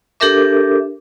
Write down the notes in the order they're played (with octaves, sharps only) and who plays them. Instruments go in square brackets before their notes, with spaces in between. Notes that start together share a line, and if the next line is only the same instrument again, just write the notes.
[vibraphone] D4 G4 A4 A#4 E5 D6